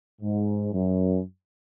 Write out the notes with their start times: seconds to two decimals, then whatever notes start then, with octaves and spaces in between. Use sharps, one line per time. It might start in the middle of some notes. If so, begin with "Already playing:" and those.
0.21 G#2
0.73 F#2